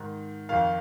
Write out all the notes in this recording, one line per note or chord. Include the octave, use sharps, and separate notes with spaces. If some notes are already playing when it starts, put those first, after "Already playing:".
Already playing: G#2 D#3
F2 D#3 F5